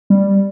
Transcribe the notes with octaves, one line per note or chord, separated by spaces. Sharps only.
G3